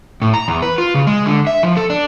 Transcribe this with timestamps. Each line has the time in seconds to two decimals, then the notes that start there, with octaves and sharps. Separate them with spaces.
0.22 A2
0.34 A#5
0.48 E2
0.62 B4
0.78 F4
0.94 C#3
1.07 G#3
1.26 D3
1.47 E5
1.63 F3
1.77 A4
1.90 D4